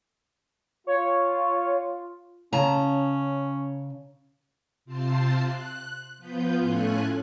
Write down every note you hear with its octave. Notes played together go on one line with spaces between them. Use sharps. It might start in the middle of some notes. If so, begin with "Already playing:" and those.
F4 C#5
C#3 C#4 A5 A#5
C3 C4 F4 C5 A5 C7
F#6
F3 B3 F4 B4 G6
A2 A3 C#4 F4 G#5 F#6